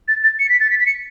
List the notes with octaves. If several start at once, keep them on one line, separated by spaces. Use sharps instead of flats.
A6
A6
C#7
B6
A6
B6
B6
C#7